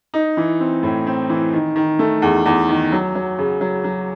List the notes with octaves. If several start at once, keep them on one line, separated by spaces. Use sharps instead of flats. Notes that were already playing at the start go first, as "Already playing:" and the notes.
D#4
E3
C4
A2
C4
E3
D#3
D#3
A3
E2
E2
D#3
F#3
F#3
C#3
F#3
F#3